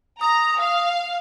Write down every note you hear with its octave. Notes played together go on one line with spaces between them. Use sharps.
A#5 D#6
F5